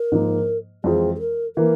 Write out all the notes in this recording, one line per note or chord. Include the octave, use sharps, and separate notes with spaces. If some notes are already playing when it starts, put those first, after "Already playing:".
Already playing: A#4
G#2 F3 A#3
F2 E3 G#3 C4 F4 G#4
G#4
A#4
E3 A#3 A#4